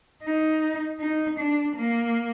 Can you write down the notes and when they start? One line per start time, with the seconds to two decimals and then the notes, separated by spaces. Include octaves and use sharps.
0.23 D#4
1.00 D#4
1.38 D4
1.77 A#3